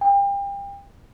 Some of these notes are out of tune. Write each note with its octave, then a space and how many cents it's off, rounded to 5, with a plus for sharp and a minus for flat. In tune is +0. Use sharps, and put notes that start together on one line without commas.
G5 +30